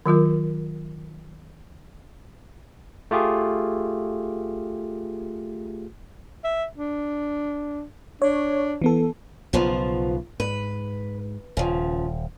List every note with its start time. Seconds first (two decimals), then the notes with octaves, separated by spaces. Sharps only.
0.06 D#3 F#3 F4 A#4
3.11 A3 F4 G4 G#4
6.44 E5
6.78 D4
8.22 D4 C#5
8.82 E3 B3 A4
9.53 B1 C#3 F3 B3 F4
10.40 G#2 B4
11.57 D#1 C#3 F3